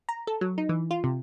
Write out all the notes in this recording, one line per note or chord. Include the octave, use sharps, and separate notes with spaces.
A#5
A4
F#3
D#4
E3
F4
C3